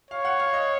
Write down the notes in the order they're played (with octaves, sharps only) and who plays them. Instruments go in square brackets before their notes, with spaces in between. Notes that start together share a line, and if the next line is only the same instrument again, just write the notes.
[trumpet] C#5 [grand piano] F5
[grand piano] F#5
F5
D#5